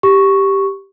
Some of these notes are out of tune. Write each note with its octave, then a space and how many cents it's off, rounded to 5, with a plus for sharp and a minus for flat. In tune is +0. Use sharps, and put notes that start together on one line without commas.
G4 +0 C#6 +0